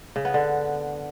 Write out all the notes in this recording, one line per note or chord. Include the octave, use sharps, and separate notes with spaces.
C#3
B3
D3